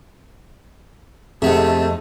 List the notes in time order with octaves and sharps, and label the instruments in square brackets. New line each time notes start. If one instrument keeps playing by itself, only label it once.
[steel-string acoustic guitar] F2 D#4 [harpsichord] C3 C4 [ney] A3 [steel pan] G#4 F#5